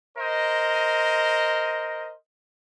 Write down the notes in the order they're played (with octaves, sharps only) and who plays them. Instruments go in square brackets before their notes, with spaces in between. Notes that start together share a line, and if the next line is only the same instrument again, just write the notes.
[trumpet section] A#4 C5 D#5